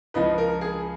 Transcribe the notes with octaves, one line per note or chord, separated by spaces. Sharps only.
C#2 C#3 F3 B4 D#5
A#4
G#4